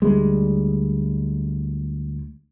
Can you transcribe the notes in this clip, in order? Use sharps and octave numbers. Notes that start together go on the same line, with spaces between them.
D2 G3 G#3